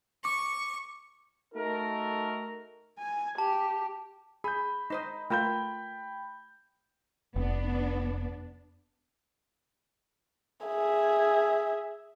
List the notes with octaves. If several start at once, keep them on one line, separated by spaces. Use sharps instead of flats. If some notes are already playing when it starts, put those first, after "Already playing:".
C#6 D6
A3 D#4 F#4 A4 A#4
G#5
G4 A5
G#4 B5 G6
D#4 C5 D#5
A3 F4 A#4 G5 B5 G6
F1 B3 D4
G#4 E5